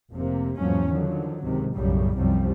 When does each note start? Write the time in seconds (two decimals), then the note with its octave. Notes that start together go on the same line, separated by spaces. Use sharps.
0.12 F1 C3 A#3
0.58 E2 G#2 F3 F#3 A#3 C#4
0.90 D3 D#3 F3 F#3
1.42 C#2 G#2 C3 D#3
1.74 B1 F#2 A2 C#3 G3
2.16 C2 F#2 C3 F3 G3